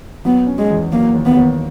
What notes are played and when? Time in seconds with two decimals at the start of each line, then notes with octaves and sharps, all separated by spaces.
0.25 F#3 B3
0.46 C#4
0.59 G#3
0.70 E2
0.92 F#3 A#3
1.14 D#2
1.26 B3
1.37 D#2